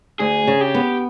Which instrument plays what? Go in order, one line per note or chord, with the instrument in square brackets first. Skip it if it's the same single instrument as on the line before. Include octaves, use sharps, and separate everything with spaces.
[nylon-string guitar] D2 [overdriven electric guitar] G#4
[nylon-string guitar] C#3
[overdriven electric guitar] G4
[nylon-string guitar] B3